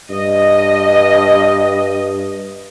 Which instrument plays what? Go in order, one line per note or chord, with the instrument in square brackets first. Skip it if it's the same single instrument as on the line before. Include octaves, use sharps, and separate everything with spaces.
[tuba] G2 [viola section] D#5